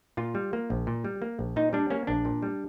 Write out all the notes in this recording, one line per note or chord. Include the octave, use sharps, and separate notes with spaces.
A#2 F4
G3
A#3
A#1
A#2
G3
A#3
A#1
A#2 D#4
G3 D4
A#3 C#4
A#1 D4
A#2
G3